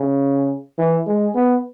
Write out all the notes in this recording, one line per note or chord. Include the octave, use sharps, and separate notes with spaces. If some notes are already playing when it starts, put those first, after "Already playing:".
Already playing: C#3
E3
G#3
B3